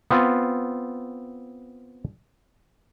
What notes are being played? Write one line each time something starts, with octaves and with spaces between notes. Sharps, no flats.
B3 C4 F4